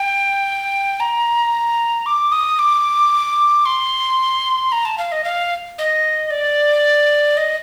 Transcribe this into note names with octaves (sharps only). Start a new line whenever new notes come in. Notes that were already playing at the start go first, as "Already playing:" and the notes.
Already playing: G5
A#5
D6
D#6
D6
C6
A#5
A5
F5
D#5
F5
D#5
D5
D#5